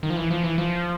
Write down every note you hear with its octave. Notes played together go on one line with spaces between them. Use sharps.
D#3
F3
E3
F3
E3
F3